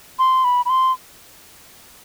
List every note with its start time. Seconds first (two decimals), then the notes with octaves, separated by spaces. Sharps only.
0.19 C6
0.44 B5
0.65 B5
0.69 C6